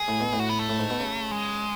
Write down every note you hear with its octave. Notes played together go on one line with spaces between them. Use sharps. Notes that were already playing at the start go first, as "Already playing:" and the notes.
Already playing: G#4
A2
B2
A2
F#4
B3
A3
A2
G#2
B2
C#3
G#3